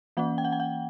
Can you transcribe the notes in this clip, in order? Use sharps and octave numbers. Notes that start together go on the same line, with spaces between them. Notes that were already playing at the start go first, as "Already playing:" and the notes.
E3 A#3 C#4 F#5
G5
F#5
G5
F#5